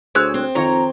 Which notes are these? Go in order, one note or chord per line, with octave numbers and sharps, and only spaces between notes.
D2 G#4 C5 C#5 E6 F#6
C4
F2 D#3 D#4 C#5 A#5